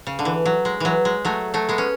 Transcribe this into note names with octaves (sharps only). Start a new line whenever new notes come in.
C#3
D3
E3
F#3
G#3
E3 F#3
G#3
F#3 A3
F#3 A3
G#3 B3
C#4